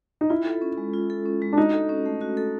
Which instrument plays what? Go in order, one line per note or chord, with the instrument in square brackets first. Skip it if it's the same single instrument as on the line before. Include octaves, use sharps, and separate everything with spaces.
[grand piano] D#4
[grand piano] E4 [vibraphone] F4
[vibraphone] A4
C#4
G#3
F4
A4
C#4
G#3
[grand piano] D4
[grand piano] D#4 [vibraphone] F#4
[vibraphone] A4
C#4
A3
F#4
A4